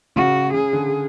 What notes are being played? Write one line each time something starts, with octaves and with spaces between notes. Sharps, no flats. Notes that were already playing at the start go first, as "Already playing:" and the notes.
C#3 F#4
C#3 G#4
D3